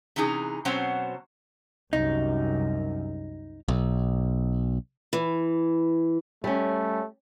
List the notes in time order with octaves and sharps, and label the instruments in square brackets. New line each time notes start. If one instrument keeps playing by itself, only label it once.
[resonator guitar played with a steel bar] C3 E3 C#4 D#4 G#4
B2 F#3 C4 C#4 C5 F#5
[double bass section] C2 F#2 [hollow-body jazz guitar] D#4
[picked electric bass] B1
[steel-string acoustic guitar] E3
[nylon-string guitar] G3 C#4 [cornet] A3